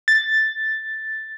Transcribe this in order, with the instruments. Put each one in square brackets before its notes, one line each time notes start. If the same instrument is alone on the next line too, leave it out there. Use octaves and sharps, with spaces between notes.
[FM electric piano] A6